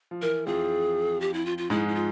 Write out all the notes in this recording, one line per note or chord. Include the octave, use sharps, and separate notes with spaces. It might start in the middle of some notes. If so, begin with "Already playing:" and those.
F3
E3 A#4
F2 F3 G#4
G4
E4
F4
F4
G#2 G#3 E4
E4
F4